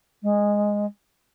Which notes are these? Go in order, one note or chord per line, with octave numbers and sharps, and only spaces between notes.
G#3